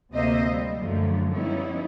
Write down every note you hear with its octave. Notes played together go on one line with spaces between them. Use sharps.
D2 C3 A#3 C5 D#5 E5
G3
F#2 D3 F3 A3
F3 G3 B3 C#4 D#4 E4